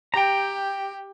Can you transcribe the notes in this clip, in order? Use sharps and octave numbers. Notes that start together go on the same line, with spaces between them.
G4 G5 A#5